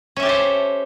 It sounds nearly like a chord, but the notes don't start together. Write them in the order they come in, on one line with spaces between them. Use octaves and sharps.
C#4 E5 G4 A4 C5